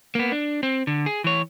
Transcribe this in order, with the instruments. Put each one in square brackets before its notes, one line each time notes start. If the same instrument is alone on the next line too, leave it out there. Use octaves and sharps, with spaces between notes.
[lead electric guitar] A#3 B3
D4
C4
D3
G#4
E3 C#5